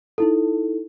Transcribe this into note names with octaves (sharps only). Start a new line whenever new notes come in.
D#4 E4 A4